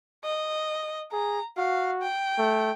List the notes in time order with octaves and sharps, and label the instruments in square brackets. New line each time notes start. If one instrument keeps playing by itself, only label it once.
[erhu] D#5
[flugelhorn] G#4 [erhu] A#5
[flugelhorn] F#4 [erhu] F5
[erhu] G5
[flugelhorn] A3